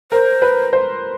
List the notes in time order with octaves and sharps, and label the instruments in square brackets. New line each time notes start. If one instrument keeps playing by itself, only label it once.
[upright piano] A#4 [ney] C5
[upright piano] B4
C5